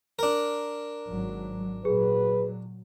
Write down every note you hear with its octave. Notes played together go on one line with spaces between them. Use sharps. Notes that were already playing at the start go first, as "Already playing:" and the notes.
D4 A#4
G#1 G#2 F#3
A#2 F#3 G#4 B4